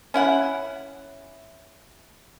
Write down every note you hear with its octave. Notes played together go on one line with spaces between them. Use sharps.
C#4 E4 F#5